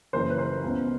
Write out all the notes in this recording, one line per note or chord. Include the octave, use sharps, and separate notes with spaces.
F#1 F#2 C#3 E3 A#4 C5
B4
A#4 C5
C#2 B2